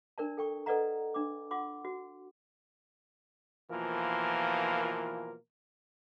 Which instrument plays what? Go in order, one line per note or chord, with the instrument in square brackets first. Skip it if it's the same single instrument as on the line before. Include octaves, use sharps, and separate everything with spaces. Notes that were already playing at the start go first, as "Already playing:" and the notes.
[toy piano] D4 A#4 D5 A5
A4 G5 C#6
A4 B4 D5 D#5 F#5 A#5
D4 D6
F4 F#5 C6 D6
F#4
[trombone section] B2 E3 F3 A#3 F4 A#4